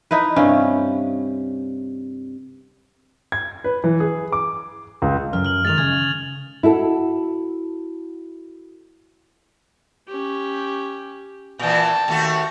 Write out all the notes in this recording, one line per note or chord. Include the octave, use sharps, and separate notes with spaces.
D#4 E4 B4
G2 C3 C#4
G#6
B4
E3
G#4
D6
C#2
F#2 F6
F6 F#7
D#3 G#3 A6 F7
C#3 G#6
E4 F#4 A4
C#4 G4
A#2 E3 G5 A5
D#2 A3 F#4